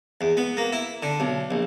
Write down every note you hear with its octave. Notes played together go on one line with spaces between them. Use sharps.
E2
B3
A#3
E4
D3
B1
A#1